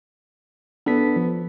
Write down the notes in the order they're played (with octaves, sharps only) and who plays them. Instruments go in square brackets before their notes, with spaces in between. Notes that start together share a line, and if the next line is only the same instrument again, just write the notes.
[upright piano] B3 [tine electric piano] D4 A4 B6
[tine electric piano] F3